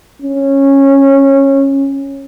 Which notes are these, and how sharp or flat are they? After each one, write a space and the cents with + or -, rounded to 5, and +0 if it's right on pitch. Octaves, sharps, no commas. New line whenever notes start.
C#4 -15